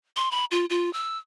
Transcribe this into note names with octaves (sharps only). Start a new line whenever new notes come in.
C6
B5
F4
F4
E6